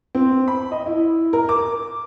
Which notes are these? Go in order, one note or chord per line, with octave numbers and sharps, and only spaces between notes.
C4
B5
D#5
E4
A#4
D6